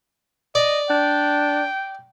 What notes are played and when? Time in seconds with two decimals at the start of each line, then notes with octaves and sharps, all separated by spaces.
0.55 D5 D#5
0.90 D4 G5